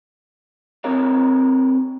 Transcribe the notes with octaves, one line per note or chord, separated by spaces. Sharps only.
C4 D#4 G4 A#4 C#5 F5